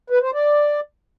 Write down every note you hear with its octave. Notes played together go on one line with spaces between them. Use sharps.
B4
C5
D5